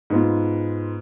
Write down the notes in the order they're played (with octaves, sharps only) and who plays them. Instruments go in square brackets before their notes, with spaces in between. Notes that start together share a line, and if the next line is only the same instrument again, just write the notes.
[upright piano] G#2 B3 F4